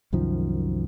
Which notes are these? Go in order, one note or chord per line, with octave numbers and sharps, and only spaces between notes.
C2 F#2 D#3 F3